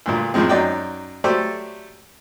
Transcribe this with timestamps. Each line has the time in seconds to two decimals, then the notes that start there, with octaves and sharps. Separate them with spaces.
0.06 D2 G2 A#2
0.34 F#2 A2 F3 G#3 C4
0.49 F#2 F#3 D#4 D5 G5
1.24 F#3 A3 G4 A4 C5 D5